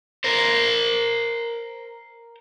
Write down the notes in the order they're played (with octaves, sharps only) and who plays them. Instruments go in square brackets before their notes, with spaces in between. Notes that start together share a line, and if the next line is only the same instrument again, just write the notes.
[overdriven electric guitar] A#4 C5